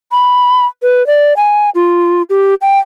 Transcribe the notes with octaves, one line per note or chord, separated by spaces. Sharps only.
B5
B4
D5
G#5
F4
G4
G5